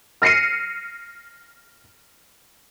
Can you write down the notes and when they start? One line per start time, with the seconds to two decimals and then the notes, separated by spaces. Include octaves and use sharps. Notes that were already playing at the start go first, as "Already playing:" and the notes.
0.22 F6 A#6 C7 C#7 D#7